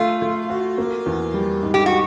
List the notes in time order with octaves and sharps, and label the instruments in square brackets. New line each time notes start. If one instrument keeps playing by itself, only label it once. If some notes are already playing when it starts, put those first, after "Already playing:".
Already playing: [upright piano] A3 [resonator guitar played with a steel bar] F4
[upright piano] A3
F#4
A#3
E2
G3
G#2
[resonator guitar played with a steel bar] G4
F#4